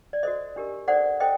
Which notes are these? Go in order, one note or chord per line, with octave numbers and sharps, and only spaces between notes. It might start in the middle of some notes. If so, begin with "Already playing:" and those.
D5
F#4 A4 C5 D#5
D4 G4 A#4
D4 A4 C5 D5 F#5
A4 C5 D#5 G5